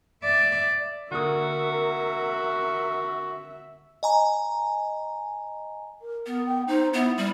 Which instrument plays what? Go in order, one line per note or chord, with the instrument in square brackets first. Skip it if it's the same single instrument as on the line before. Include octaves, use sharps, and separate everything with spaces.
[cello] D5 E5
[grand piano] D3 A#3 D#6 [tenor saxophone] F#4 [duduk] A#4 [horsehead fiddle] E5
[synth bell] D#5 G#5 A#5
[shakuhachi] A#4
[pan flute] B3
[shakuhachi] G5
[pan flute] D#4 [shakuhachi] C5
[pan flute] B3 [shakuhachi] E4
[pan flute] G3